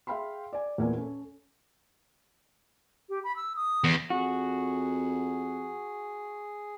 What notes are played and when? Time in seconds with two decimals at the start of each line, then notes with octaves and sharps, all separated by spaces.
0.07 G#4 E5 F5 G5 B5 C6
0.53 D5 G#5
0.78 E2 A#2 A3 G#5
0.97 C#4 A4
3.09 G4
3.24 B5
3.36 E6
3.56 D#6
3.84 E2
4.10 F2 F#4 G#4